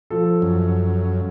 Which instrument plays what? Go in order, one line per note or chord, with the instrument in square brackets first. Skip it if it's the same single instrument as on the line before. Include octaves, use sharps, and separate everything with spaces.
[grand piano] F3 A4
[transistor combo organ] F#2